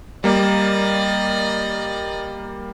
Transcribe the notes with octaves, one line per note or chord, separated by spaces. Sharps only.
G3 A#3 D5 D#5